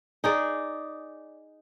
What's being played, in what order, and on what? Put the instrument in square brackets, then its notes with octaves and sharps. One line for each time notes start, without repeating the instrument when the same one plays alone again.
[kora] D#4 G#4 D5